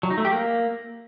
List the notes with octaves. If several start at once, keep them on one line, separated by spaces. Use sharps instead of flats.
F#3
D#4
A3
G4
A#3